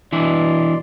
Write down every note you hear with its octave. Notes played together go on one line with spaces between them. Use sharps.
B2 E3 D4 E4 D5 C6